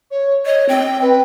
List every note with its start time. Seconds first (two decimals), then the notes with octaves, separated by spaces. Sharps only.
0.11 C#5
0.46 C#5 D#5
0.69 C4 G5
1.02 B4